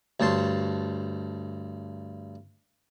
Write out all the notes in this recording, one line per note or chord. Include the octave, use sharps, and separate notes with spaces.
D2 G2 C#5 A5 C6